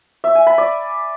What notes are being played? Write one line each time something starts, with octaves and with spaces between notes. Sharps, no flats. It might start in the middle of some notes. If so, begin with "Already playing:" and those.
E5
G#5
B5
D5